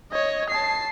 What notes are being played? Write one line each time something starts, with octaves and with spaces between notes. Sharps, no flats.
C#5 D#5
A5 C7